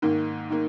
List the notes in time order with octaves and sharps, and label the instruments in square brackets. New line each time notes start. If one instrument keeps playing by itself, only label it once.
[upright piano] G#2 D#3 A#3
D#3 A#3